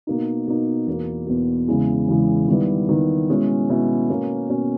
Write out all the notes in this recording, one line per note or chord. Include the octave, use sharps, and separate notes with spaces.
B2 A#3 D#4
B2 A#3 D#4
E2 B2 A#3
E2 B2 A#3
E2 C#3 E3 G#3
E2 C#3 E3 G#3
D#3 G3 B3 E4
D#3 G3 B3 E4
B2 G#3 C#4 E4
B2 G#3 C#4 E4
B2 A#3 C#4
B2 A#3 C#4